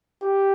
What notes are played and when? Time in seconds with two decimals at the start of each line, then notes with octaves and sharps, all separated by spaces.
0.23 G4